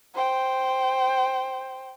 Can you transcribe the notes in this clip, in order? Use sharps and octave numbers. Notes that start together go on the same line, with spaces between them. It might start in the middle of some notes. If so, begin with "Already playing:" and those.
C5 G5